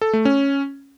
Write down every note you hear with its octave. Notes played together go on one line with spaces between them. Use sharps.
A4
A3
C#4